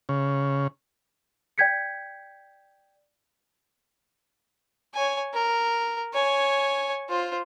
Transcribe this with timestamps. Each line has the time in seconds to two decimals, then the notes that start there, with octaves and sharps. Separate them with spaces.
0.09 C#3
1.58 D5 G5 G6 G#6 B6 C#7
4.94 C#5 G#5
5.34 A#4
6.14 C#5 G#5
7.09 F4 C5